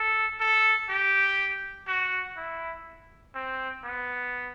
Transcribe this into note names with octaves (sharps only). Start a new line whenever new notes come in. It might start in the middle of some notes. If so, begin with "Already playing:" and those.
Already playing: A4
A4
G4
F#4
E4
C4
B3